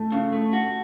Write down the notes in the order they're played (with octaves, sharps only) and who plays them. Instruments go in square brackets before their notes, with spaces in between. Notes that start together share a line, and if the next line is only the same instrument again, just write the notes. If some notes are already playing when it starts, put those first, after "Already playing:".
Already playing: [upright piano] A3
[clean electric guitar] C#3
A3
F#4